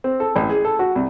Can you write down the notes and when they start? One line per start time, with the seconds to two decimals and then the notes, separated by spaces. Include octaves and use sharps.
0.04 C4
0.20 A4
0.36 A1
0.49 G#4
0.65 A4
0.79 F#4
0.96 C2